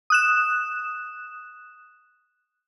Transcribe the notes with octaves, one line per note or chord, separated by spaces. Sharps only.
D#6 F#6 E7